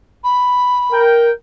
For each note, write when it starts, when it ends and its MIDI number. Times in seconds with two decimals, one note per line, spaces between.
0.24 1.02 83
0.92 1.31 70
0.92 1.31 79